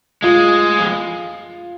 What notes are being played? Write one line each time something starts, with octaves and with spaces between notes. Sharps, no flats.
G#3 F4
F3